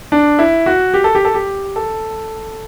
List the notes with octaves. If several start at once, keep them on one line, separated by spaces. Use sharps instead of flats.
D4
E4
F#4
G4
A4
G4
A4
G4
A4